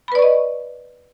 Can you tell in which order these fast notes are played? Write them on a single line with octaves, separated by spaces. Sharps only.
B5 B4 D5 C#6 D#5